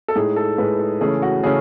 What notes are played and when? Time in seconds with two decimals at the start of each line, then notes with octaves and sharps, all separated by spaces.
0.08 A4
0.15 A2 G#3 D#4 G#4
0.36 A4
0.58 A2 G#3 D#4 B4
0.79 A4
1.01 C#3 E3 A3 C#4 G#4
1.22 F#4
1.43 C#3 E3 A3 C#4 G#4